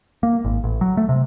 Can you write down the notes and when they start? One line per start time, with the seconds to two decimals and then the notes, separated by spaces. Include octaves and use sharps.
0.23 A#3
0.45 G#1
0.64 A1
0.81 F#3
0.97 A3
1.09 C3